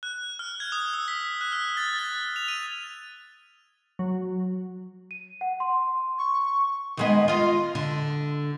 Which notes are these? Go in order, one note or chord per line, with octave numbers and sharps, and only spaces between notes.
F#6
F6
G#6
D#6
E6
B6
F#6
F6
A6
A6
F7
D#7
F#3
D#7
F#5
C6
C#6
D#3 G#3 B3
F4 D#5
D3